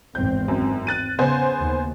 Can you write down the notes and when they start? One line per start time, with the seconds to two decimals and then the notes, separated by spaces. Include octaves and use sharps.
0.15 G#1 E2 C4 G6
0.48 F#2
0.87 F#6 A6 D#7
1.19 C#3 B3 C5 G#5
1.60 D#2